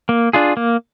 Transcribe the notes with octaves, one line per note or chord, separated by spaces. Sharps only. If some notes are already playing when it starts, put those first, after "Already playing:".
A#3
D4 F4 G#4
A#3